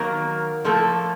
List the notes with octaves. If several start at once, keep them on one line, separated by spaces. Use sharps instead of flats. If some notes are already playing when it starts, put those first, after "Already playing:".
Already playing: D#3 F#3 A#3 A#4
A2 F3 A3 A#3 A4